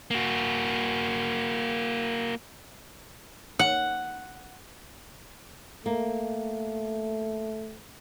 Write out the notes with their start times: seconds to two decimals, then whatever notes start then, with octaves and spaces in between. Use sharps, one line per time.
0.11 A#3 F#4
3.59 F#5
5.86 A3 A#3